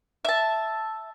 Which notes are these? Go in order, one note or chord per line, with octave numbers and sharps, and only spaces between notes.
E5 A5